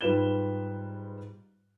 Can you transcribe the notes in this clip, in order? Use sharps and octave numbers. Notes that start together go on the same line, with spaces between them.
G#2 G3 F4 B4 E7 G7